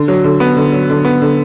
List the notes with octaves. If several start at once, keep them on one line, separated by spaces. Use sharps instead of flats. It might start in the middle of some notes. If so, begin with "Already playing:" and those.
Already playing: D3
F#3
D3
B3
D3
F#3
D3
B3
D3